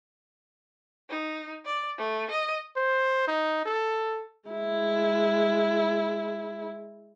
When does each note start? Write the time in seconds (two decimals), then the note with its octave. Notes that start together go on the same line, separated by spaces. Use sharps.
1.10 D#4
1.66 D5
1.98 A3
2.31 D#5
2.77 C5
3.28 D#4
3.66 A4
4.49 G#3 E4